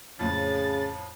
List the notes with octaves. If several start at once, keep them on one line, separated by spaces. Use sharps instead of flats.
F2 A2 C#3 A6